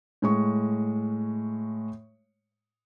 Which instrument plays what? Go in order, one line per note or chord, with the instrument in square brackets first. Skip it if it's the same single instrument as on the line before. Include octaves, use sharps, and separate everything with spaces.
[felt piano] A2 G#3 C#6